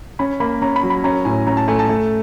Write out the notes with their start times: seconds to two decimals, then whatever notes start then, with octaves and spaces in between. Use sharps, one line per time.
0.19 C#4 B5
0.40 A#3 B5
0.62 C#4 A#5
0.76 B5
0.83 F#3
0.90 B5
1.04 C#4 A#5
1.25 A2 G#5
1.46 C#4 A#5
1.57 A5
1.68 A3 G#5
1.79 A5
1.89 A3